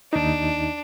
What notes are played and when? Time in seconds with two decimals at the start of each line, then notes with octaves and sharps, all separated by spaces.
0.13 D#2 D4 D#4